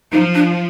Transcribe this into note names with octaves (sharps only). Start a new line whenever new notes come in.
F3 D#4
D4